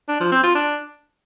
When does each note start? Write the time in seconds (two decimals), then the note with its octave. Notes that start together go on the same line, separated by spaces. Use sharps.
0.09 D4
0.20 F3
0.32 C4
0.43 F4
0.55 D4